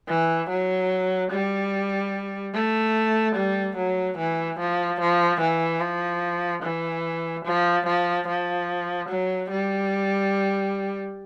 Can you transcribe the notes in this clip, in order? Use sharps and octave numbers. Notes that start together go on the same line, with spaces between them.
E3
F#3
G3
A3
G3
F#3
E3
F3
F3
E3
F3
E3
F3
F3
F3
F#3
G3